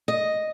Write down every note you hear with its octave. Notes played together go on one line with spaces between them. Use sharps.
D#5